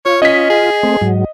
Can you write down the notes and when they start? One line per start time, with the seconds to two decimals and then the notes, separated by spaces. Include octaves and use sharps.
0.06 F4 C#5
0.22 C#4 D#5 B6
0.50 G#4
0.83 A3 C4
1.01 G#2 F#3